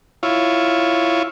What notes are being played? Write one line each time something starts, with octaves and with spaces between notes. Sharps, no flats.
E4 F4 C#5